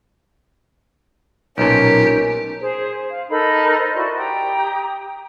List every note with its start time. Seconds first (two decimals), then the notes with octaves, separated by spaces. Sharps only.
1.58 B1 A#2 C#4 D#4 G4 A#4
2.60 G#4 C5
3.10 F5
3.30 D#4 A4 A#4 B5
3.78 C5
3.94 E4 F#4 D5 C6
4.17 G4 G5 A#5 D#6